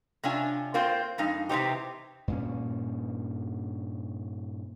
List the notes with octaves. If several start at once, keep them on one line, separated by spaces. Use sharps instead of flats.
C3 C#4 D4 F4 G#5
A#3 C4 F4 C5
F2 G#3 D#4 F5
C3 E3 G3 C4 D#4 G4
G2 A#2 C#4